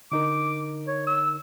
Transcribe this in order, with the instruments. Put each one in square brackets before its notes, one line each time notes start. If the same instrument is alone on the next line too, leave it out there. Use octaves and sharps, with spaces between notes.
[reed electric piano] D3 D#4 A#4 [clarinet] D6
[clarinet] C#5
E6